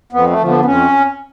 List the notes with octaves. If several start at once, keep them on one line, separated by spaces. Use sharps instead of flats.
F2 B3
A3
D3 F3
B3
B3
F2 C#4